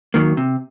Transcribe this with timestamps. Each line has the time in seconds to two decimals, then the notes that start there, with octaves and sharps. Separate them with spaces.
0.14 D#3 F#3 A#3
0.37 C3